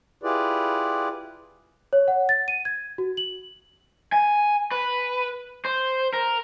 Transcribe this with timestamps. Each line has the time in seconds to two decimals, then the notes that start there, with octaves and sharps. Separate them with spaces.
0.23 E4 F4 G4 G#4 B4 D5
1.93 C#5
2.08 F#5
2.29 A6
2.48 D#7
2.65 G#6
2.98 F#4
3.17 F#7
4.12 G#5
4.71 B4
5.65 C5
6.13 A#4